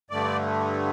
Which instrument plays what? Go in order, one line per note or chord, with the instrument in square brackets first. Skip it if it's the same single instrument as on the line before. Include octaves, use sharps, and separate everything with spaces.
[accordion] G2 D3 A3 D5